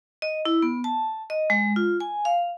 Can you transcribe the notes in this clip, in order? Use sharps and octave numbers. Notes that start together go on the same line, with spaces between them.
D#5
E4
B3
A5
D#5
G#3
F4
G#5
F5